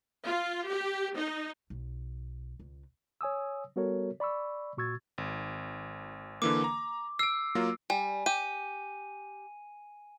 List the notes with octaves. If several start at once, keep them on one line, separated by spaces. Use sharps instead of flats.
F4
G4
D#4
B1
C#2
C#5 G#5 D#6 E6
G3 B3 F#4 A4 A#4 C#5
D5 B5 C#6 E6
A#2 F#4 C#6 E6 G#6 A6
G#1
D3 E3 A#3 D6
A#5
E6 C7 D7
F#3 A#3 F4
G3 G#5
G4 D#7